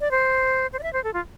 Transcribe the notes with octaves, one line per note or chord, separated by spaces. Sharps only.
D5
C5
C5
D5
E5
C5
A4
F4